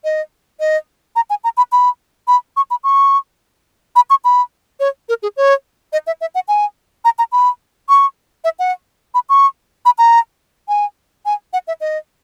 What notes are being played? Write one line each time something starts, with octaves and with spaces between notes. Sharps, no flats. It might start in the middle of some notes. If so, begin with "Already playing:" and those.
D#5
D#5
A#5
G#5
A#5
B5
B5
B5
C#6
B5
C#6
B5
C#6
B5
C#5
A#4
G#4
C#5
D#5
E5
E5
F#5
G#5
A#5
A#5
B5
C#6
E5
F#5
B5
C#6
B5
A#5
G#5
G#5
F#5
E5
D#5